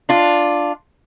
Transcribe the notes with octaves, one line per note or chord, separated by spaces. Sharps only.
D4 F4